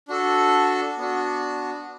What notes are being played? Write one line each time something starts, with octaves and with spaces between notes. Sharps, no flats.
D4 F#4 A4
B3 D4 F#4